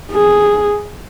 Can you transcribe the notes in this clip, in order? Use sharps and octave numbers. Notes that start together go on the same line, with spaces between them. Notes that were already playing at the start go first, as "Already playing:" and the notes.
G#4